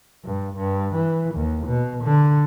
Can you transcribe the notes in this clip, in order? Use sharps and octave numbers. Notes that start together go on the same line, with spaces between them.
G2
G2
E3
D#2
B2
D3